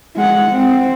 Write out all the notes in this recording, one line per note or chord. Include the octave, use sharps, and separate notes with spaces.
G#3 F#5
C4